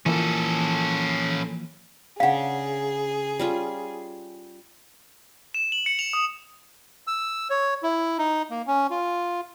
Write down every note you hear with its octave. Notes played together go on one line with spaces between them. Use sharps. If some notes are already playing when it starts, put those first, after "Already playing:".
E3 F3 A#3 C#4 A4
C#3 D4 G#4 F5 F#5
G3 C#4 F4
E7
F#7
C#7
F7
D#6
E6
C#5
E4
D#4
A#3
C#4
F4